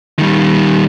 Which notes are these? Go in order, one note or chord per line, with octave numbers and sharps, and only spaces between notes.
D#3 G3